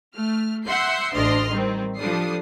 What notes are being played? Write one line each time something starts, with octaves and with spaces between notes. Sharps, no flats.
A3 F6
E5 F#5 C6 G6 C7
A1 D2 D4 D#5 C6 F6
D#3 G3 C4
F3 G3 D4 A4 D#6 C7